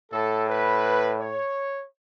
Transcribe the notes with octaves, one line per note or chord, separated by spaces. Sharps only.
A2 A4
B4
C#5